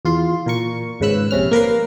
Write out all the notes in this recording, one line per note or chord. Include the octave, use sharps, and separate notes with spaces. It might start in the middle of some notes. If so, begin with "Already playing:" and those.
E2 F4 C6
A#2 A#4 C#6
G#1 G#2 C#3 B4 E6 F#6
A#1 C3 C#4 F6
A#3 A#4 B4 F5